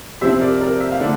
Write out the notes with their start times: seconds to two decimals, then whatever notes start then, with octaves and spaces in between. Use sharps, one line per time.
0.21 C3 F3 C4 C5 E5
0.41 A#4 D5
0.61 A#4 D5
0.80 E5
0.91 F5
1.00 D3 A3 D4